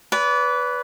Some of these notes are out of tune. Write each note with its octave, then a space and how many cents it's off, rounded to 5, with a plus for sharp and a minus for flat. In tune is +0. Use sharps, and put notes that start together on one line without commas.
B4 +0 D5 -35